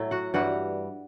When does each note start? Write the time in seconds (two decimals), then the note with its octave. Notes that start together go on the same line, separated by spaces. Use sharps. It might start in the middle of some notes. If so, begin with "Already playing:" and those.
Already playing: A2 F#3 A3
0.11 F#4 F#5
0.34 G2 E3 G3 F#4 F#5